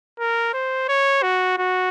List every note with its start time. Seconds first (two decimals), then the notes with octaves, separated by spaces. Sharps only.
0.20 A#4
0.54 C5
0.89 C#5
1.23 F#4
1.58 F#4